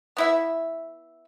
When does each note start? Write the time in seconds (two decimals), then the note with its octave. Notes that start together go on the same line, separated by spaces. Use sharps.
0.17 B3 E4 E5